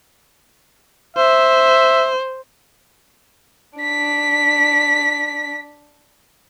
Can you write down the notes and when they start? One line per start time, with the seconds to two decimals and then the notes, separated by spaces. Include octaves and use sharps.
1.17 C5 E5
3.78 D4 B6